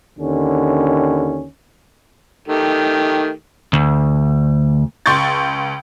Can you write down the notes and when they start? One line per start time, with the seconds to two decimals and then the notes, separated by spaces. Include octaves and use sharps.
0.18 D#2 D3 C#4
2.48 D#3 A3 G4
3.73 D2
5.06 C#2 C6 C#6 G6 A6